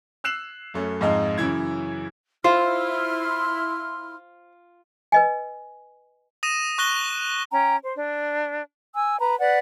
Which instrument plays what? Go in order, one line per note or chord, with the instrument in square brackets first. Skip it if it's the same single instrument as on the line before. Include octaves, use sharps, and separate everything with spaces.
[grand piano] E6 F#6 C7 E7 F#7
F#2 A3 C#4
F2 G#2 G#3 D#4 D#5 F5
F#2 C#3 E3 E4 G#6
[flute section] E4 C6 F6 [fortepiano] F4 [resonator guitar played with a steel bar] C5
[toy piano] B4 D#5 G#5
[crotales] D#6 A#6 D#7 E7
C#6 F#6 A#6 G7
[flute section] C#4 G5 A#5
C5
D4
G#5 E6
B4 A#5
B4 D5 F#5